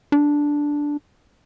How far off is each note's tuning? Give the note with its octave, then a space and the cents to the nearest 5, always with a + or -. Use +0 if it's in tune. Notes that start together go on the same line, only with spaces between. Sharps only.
D4 -5